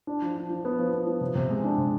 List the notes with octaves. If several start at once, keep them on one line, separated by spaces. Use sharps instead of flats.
D4
F3
D4
F3
B3
F3
B3
F3
C3
C3
G#3
D4
C3